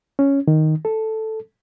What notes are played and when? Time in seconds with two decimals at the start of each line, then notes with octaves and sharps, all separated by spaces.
0.19 C#4
0.48 D#3
0.85 A4